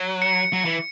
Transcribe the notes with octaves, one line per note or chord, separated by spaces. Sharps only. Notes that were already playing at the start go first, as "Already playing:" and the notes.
Already playing: F#3
C#7
F#3
E3